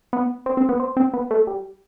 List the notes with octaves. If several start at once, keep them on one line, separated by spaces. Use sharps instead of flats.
B3
C4
C4
B3
C4
C4
B3
A3
G3